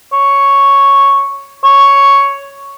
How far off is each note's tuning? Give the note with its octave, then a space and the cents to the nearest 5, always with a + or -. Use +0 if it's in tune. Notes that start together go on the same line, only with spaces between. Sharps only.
C#5 +0
C#5 +5